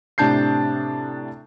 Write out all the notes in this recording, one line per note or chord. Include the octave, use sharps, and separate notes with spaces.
A2 C3 D4 A5 G6 C7